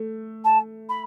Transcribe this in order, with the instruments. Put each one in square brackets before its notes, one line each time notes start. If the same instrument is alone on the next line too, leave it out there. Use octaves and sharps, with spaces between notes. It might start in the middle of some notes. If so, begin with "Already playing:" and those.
Already playing: [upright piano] A3
[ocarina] A5
B5